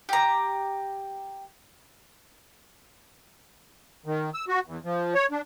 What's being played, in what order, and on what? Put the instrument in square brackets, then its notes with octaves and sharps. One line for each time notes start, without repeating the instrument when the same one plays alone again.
[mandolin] G4 A#5
[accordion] D#3
E6
F#4
E2
F3
C#5
D4